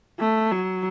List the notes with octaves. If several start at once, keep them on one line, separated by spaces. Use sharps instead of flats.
A3
F#3